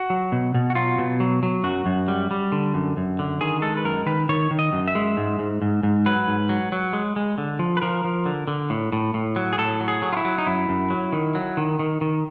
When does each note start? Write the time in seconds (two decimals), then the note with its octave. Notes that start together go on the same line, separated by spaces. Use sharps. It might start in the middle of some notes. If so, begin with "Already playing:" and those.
Already playing: F#4
0.10 F#3
0.32 B2
0.54 B2
0.70 F#4
0.75 F#3 F4
0.98 B2
1.20 F#3
1.43 F#3
1.64 F#2 F#4
1.86 F#2
2.08 G3
2.31 G3
2.52 D3
2.74 F#2
2.97 F#2
3.19 D3
3.41 D#3 G#4
3.62 G#3 A4
3.77 B4
3.84 F#2 A#4
4.06 D#3 B4
4.29 D#3 C#5
4.51 D#3
4.59 D#5
4.73 F#2
4.88 E5
4.95 G#3
5.17 G#2
5.39 G#2
5.62 G#2
5.83 G#2
6.06 F#3 B4
6.28 G#2
6.49 F#3
6.72 F#3
6.93 G#3
7.16 G#3
7.38 D3
7.59 F3
7.77 B4
7.82 F3 A#4
8.04 F3
8.26 D3
8.48 D3
8.70 A2
8.92 A2
9.14 A2
9.36 F#3
9.53 G#4
9.58 A2 A4
9.80 F#3
9.88 G#4
10.02 F#3
10.13 F4
10.17 E4
10.25 F#3
10.38 D#4
10.47 F#2 E4
10.69 F#2
10.90 F#3
11.13 D#3
11.35 F#3
11.57 D#3
11.79 D#3
12.01 D#3